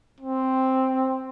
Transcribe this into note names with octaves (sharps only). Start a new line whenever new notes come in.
C4